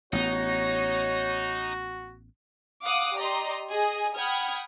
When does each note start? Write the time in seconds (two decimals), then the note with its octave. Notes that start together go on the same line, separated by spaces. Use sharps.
0.13 A1 B3 D#4 F#4 C#5
2.84 F5 F#5 D6 D#6 F#6
3.17 G4 D5 D#5 A#5 C6
3.70 G#4 D#5 G#5
4.16 F#5 G5 B5 D#6 F6 G#6